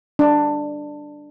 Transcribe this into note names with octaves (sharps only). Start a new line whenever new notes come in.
D4